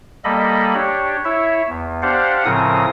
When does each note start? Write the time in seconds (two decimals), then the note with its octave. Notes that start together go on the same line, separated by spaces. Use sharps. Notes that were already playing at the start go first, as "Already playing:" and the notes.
0.24 G3 A#3 A4 D#5 B5
0.74 D4 G4 C#5
1.25 E4 C#5 E5
1.69 E2
2.02 D4 G4 C5 D5 F5 F#5
2.45 A2 C#3 F3 C4 A#4 D#6